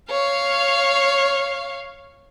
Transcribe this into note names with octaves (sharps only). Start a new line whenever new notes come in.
C#5 F5